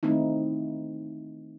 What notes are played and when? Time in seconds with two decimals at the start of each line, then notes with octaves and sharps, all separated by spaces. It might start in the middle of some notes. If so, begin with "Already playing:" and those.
0.03 D#3 A3 C4 D#4 E4